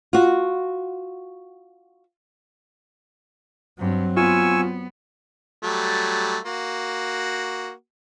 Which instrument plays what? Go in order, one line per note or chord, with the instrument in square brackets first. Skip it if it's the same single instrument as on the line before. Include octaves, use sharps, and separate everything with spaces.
[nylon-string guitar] F4 F#4
[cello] G2 [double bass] F#3 C4
[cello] B3 [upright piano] F4 [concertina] G#5 C#6 E6
[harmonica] F#3 G3 A3
A#3 F#4